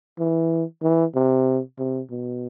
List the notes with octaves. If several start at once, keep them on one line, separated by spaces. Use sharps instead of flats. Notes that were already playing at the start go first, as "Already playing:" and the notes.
E3
E3
C3
C3
B2